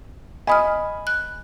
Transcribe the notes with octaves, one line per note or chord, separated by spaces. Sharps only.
D#5 G#5 B5 D#6 F6
F#6